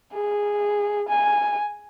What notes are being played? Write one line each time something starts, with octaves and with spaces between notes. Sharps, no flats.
G#4
G#5